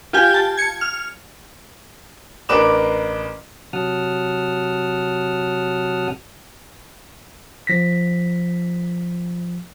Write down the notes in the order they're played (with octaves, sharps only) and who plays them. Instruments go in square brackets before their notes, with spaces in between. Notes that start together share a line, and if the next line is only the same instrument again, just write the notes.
[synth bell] F4 G4 G5 G#5
A5
G#6 C#7
F6
[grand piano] A1 D4 A#4 B4 D6 E7
[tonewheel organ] C3 F#3 F#5 A5 D#6 F6
[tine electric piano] F3 A#6 B6